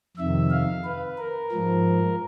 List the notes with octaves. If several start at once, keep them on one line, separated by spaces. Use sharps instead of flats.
F2 C3 D#3 E5
F5
B4
A#4
G#2 F3